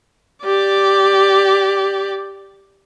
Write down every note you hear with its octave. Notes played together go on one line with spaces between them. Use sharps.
G4 D5